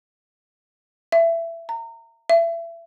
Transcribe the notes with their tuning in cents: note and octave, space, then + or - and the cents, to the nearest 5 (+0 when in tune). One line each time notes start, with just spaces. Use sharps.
E5 +20
A#5 -30
E5 +30